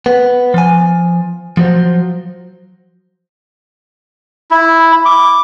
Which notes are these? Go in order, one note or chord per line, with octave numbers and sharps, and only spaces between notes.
B3
F3 G#5
F3 F#3 C5
E4
D6